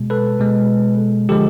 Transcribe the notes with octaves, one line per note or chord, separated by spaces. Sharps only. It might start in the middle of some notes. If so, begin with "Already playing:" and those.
Already playing: B2 G#3
A4 B4
B2 G#3
D3 F3 G#3 G4 A4